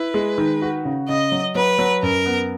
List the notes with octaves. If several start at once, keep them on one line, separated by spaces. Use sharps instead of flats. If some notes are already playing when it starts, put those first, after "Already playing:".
Already playing: E4 B4
G#3
D#3
F#4
C#3
C#3 D#5
F#3
F#3 B4
F#3
F#2 A#4
B3